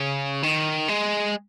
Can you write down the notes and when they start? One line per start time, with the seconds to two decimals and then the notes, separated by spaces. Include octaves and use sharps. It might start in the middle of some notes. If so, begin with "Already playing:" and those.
Already playing: C#3
0.43 D#3
0.89 G#3